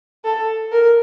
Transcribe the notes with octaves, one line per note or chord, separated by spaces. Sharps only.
A4
A#4